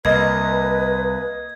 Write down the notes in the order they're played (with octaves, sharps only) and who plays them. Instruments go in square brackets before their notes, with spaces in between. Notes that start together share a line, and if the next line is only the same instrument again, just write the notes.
[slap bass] C2 [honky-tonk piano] A#3 D#5 [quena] B4 [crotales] G#6